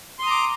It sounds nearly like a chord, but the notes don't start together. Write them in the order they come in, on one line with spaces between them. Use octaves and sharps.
C6 D#6 A#5 D6